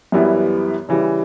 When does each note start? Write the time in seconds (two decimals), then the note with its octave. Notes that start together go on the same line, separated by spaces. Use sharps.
0.12 F#2 E3 G3 B3 E4
0.89 C#3 E3 G3